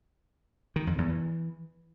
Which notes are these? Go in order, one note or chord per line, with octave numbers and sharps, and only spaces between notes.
D#3
F2
E2
E3